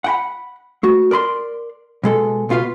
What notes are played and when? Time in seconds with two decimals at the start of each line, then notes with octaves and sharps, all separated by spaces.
0.04 F#5 G5 B5
0.83 A3 F#4
1.11 A#4 D5 B5 C6
2.03 B2 G#3 A4
2.49 C#2 B2 F4 B4 F5